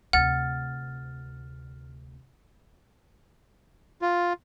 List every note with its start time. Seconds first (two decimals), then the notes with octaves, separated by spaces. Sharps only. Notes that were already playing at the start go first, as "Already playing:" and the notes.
0.13 D2 C3 F#5 F6 A6
4.02 F4